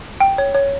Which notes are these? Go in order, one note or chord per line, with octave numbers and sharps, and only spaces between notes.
G5
C#5
C#5